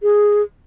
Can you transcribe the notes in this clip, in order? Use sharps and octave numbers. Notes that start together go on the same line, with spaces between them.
G#4